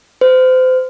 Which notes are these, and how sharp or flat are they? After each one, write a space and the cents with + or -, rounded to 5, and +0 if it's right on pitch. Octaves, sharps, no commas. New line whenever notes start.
C5 -30